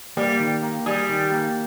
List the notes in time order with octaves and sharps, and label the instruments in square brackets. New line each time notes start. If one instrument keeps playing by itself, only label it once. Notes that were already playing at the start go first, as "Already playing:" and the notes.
[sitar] G3 [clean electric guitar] A#3
[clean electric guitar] D#3
A#3
[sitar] G3 [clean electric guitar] G#4
[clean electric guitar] D#3
A#3